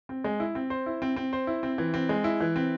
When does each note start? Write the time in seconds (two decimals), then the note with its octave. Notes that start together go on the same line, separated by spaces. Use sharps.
0.09 C4
0.24 G#3
0.40 E4
0.55 C4
0.70 C5
0.86 E4
1.02 C4
1.16 C4
1.33 C5
1.47 E4
1.63 C4
1.78 E3
1.94 C4
2.09 G#3
2.24 E4
2.40 E3
2.56 C4